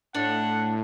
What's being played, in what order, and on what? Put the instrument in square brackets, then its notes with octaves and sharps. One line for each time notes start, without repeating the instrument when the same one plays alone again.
[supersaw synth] A2 [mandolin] D4 [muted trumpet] F#5